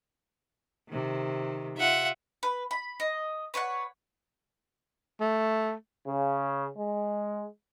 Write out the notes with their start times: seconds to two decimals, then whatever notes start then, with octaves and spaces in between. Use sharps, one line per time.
0.89 C3 D#3
1.78 F4 E5 F#5
2.43 B4
2.71 B5
3.00 D#5
3.54 B4 C#5 D5 F#5
5.21 A3
6.07 C#3
6.77 G#3